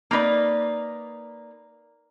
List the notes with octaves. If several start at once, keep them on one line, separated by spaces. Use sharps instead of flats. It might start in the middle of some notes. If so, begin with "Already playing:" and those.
A#3 D#4 B4 D5